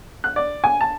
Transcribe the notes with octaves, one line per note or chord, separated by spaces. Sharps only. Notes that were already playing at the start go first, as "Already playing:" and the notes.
F#6
D5
G#5
A5